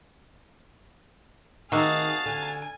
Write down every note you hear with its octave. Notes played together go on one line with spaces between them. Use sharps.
C3 D#3 D#4 F#4 G#4 F5 A5
D3 G#5